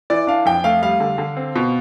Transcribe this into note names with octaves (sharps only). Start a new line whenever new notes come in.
E3 D5
D4 F5
F2 G5
A3 F5
G3 F5
D3
D3
C4
B2